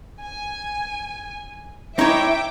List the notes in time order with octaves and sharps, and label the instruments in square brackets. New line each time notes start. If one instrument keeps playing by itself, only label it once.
[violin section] G#5
[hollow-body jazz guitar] D#4 E4 C#5 [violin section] E5 G5 D6